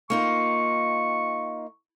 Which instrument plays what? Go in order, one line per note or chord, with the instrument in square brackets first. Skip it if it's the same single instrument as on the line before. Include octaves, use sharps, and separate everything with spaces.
[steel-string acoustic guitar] A#3 D#4 F4 [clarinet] C#6